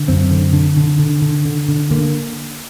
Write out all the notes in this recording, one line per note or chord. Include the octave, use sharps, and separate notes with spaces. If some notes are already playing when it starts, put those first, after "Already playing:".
Already playing: D3
F#2 C4
D3
D3
D3
D3
D3
D3
D3
D3 A#3